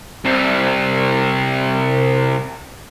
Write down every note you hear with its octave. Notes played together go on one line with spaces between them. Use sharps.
C2 C3